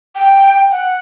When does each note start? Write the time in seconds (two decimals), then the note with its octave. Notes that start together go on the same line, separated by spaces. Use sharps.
0.15 G5
0.71 F#5